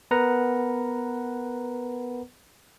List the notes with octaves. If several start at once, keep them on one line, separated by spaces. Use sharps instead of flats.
B3 A#4 B4 F#5 A#5